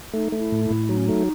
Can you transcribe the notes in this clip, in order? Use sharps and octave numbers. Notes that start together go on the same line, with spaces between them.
A3 D#4
A3
E4
A2
E4
A2
F#3 D#4
C#4
A3 D#4